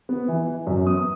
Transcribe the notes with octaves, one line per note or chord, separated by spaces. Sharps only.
B3
E3
E3
F#2
B3 D#6